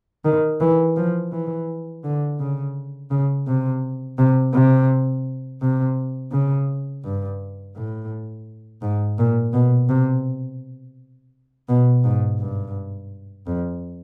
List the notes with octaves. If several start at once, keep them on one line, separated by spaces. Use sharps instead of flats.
D#3
E3
F3
E3
D3
C#3
C#3
C3
C3
C3
C3
C#3
G2
A2
G#2
A#2
B2
C3
B2
G#2
G2
F2